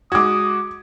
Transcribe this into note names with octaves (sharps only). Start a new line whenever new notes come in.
G#3 F#4 D6 D#6 G#6